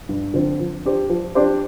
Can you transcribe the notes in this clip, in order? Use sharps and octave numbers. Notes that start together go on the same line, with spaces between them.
G2
D3 F3 C4
F3
D4 G4 C5
F3
D4 G4 C5